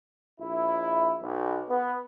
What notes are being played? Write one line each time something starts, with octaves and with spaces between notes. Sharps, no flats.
A#1 E4
B1
B3